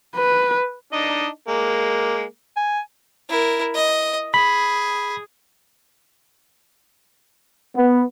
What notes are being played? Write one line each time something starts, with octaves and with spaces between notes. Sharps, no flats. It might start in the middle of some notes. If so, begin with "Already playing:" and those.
B4
D4 D#4 D#5
G#3 A#3
G#5
E4 A#4
D#5
G#4 B5
B3